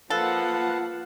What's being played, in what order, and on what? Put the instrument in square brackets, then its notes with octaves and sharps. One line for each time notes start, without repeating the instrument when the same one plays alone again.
[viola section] F3 A#3 F#5 [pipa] A4 [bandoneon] B4 F5 A5